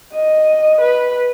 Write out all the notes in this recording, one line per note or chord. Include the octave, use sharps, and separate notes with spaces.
D#5
B4